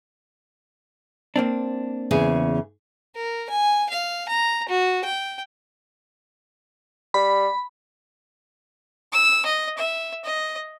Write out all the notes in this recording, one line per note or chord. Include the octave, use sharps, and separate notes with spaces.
A#3 C4 D4
E2 C#3 G#4
A#4
G#5
F5
A#5
F#4
G5
G3 B5
E6
D#5
E5
D#5